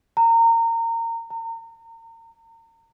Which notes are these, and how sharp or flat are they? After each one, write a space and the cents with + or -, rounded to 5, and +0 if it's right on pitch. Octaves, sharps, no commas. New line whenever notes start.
A#5 -25
A#5 -35